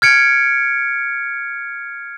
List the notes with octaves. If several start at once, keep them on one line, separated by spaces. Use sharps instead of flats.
F6 G#6 C#7 D7